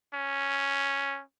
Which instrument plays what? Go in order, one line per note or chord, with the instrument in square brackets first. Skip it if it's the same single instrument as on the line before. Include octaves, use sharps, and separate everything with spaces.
[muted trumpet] C#4